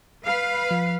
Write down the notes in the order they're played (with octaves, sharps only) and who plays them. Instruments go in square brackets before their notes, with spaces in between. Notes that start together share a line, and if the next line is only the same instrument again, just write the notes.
[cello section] B4 F5
[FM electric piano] F3 C7